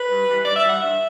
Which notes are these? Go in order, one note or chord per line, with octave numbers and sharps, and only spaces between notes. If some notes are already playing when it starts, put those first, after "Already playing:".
Already playing: B4
G2
E3 G3
G2 D5
E5
E3 G3
F#5
G2 E5